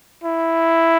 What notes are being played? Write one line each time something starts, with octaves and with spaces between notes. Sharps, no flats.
E4